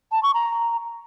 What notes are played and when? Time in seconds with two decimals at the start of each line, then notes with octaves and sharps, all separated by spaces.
0.12 A5
0.23 C#6
0.34 A#5